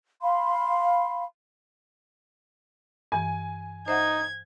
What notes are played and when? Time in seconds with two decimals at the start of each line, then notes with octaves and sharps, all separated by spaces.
0.22 F5 B5 C6
3.12 G2 E3 G#5
3.88 D#4 C5 E5 F#5 G#6